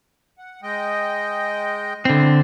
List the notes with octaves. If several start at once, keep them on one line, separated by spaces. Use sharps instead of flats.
F#5
G#3 D#5 G5
D3 C4 E4